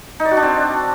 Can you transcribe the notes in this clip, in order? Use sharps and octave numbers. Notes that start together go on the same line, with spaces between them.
D#4
D5
F#4
D4
C4